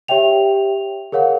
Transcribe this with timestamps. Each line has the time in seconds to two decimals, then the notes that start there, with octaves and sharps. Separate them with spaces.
0.08 G4 C#5 E5 G5 F7
1.12 G#4 A#4 C#5 F5 F#5